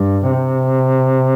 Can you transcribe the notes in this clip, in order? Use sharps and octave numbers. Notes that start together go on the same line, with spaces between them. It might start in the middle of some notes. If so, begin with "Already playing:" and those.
Already playing: G2
C3